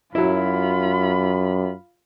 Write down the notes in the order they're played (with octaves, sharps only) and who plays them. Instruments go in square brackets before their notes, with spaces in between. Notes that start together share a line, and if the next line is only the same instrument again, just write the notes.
[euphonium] F#2 [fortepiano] F#3 E4 [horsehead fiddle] F4 B5